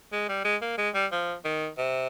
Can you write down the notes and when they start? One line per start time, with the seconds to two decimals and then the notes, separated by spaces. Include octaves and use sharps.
0.13 G#3
0.29 G3
0.45 G#3
0.61 A#3
0.78 G#3
0.95 G3
1.12 F3
1.45 D#3
1.78 C3